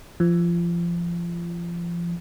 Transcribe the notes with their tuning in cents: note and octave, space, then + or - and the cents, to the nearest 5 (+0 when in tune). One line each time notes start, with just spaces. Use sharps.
F3 -25